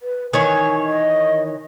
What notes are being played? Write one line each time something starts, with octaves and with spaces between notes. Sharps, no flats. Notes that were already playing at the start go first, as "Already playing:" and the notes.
B4
D#3 E3 C#5 G#5
D#5